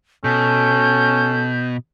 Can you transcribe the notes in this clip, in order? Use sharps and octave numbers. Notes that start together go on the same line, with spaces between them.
B2 C#4 A4 G6